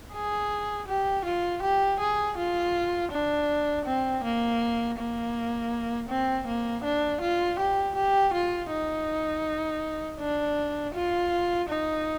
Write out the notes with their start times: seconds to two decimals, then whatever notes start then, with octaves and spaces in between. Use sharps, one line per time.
0.14 G#4
0.88 G4
1.25 F4
1.63 G4
2.00 G#4
2.38 F4
3.12 D4
3.85 C4
4.24 A#3
4.98 A#3
6.09 C4
6.47 A#3
6.84 D4
7.21 F4
7.59 G4
7.95 G4
8.34 F4
8.70 D#4
10.20 D4
10.94 F4
11.69 D#4